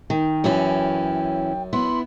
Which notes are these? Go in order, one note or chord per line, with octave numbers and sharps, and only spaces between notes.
D#3 G5
F#2 E3 C#4 E4
B3 E4 C6